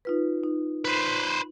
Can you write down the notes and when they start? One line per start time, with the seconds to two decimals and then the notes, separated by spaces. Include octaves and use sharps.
0.05 D#4 F4 B4
0.44 D#4
0.85 B4 C5